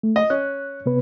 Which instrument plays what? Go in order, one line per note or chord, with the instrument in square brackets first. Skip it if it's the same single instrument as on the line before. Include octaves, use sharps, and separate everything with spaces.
[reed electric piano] A3
[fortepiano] D#5
[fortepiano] C#4 [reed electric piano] F#6
[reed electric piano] C3 B3 B4